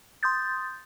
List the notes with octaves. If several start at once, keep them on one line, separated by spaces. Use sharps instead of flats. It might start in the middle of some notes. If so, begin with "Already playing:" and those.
C6 D#6 G6 A6